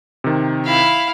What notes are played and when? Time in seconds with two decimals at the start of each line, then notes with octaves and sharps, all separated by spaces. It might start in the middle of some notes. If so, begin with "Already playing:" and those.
0.24 C3 D#3
0.65 E4 F5